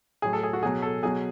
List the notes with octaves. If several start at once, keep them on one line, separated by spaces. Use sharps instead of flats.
A2 F#3 G#4
A4
G#4
F#4
B2 F#3 G#4
A4
B2 F#3 G#4